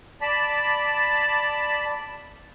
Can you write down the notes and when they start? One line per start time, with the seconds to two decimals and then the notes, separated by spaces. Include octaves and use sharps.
0.21 D5 A5 B5